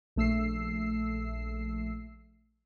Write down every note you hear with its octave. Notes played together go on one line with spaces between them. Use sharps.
A#1 A3 E6 C7